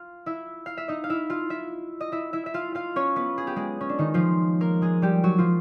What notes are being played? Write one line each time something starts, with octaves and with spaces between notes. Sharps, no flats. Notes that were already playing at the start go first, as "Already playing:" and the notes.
Already playing: F4 F5
E4 E5
F5
E5
D#4 D#5
F5
E4 E5
F4 F5
E4 E5
D#5
E4 E5
E4 E5
E5
F4 F5
F4 F5
C#4 C#5
B3 B4
G#4
G4
G#3 G#4
C#4
D4
D#3 D#4
F3 F4
A#3 A#4
G#3 G#4
G3 G4
F#3 F#4
F3 F4